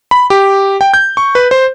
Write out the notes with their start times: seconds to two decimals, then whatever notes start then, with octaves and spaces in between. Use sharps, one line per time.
0.11 B5
0.30 G4
0.81 G5
0.94 G6
1.17 C#6
1.35 B4
1.51 C5